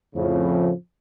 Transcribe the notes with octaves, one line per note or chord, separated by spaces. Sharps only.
F2 A2 C#3 F3